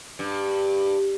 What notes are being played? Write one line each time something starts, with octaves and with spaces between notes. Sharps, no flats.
G2